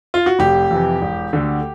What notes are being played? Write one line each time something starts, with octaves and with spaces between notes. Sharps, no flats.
F4
F#4
F1 G4
F2 C3 E3
E1
D2 D3